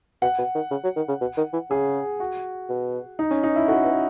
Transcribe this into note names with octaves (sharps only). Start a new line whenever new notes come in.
B2 F#5
B2
D#3
C#3
F#3
D#3
C#3
B2
D#3
E3
C#3 G#4
F#4
B2
D#4
C#4
D#4
E4
A2 F#4
B2